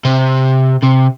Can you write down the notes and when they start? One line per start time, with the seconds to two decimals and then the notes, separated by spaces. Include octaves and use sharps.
0.05 C3
0.83 C3